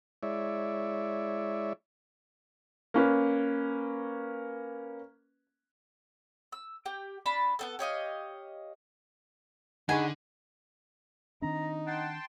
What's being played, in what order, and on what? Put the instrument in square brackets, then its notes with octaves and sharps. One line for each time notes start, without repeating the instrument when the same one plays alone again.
[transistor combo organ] G#3 E4 C#5 D5 E5
[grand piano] A#3 C#4 B4
[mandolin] E6
G4 G5
D4 F4 A5 B5
B3 C4 A4
G4 C#5 D#5 F5
[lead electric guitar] D3 [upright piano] D#4 G#4 [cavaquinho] C#5 G#5 [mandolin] F#5 B5
[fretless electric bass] D#3 C4 D4 [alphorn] D#4 [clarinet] A#5
[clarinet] F#5 [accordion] G5 A5 C6